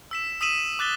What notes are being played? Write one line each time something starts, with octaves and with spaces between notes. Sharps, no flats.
E6 B6 E7
D#6 E6 B6 D#7 E7 F#7
D6 F#6 A6 B6 G7